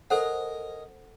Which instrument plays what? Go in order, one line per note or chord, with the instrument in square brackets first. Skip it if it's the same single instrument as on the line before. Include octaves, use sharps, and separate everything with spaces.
[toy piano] A4 C5 F#5 [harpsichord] A#4 D#5 G#5